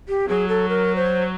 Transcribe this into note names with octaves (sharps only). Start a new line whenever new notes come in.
G4
F#3 G#4
A4
A#4
C5